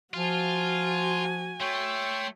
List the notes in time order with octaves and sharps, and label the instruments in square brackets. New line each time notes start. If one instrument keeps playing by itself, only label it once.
[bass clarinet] F3 [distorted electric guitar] F4 [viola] F#4 G#5
[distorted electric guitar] A3 [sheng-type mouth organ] C#5 G5 C6